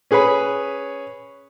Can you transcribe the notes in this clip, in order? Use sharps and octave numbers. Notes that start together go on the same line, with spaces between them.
C#4 G#4 B4 C#5 B5